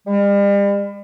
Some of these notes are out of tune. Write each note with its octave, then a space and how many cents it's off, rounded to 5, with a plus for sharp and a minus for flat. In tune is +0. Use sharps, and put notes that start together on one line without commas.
G3 +40